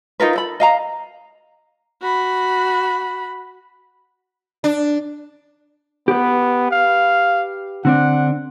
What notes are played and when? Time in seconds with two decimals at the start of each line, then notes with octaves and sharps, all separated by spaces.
0.20 D#4 F4 A#4 B4
0.36 A4 B5
0.60 D#5 F5 A#5
2.02 F#4 B5
4.64 D4
6.08 B3 G4 B4
6.72 F5
7.85 D3 C4 D4 F#5